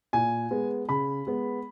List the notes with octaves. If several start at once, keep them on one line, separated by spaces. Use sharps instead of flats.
A#2 G#5
G#3 B3
C#3 B5
G#3 B3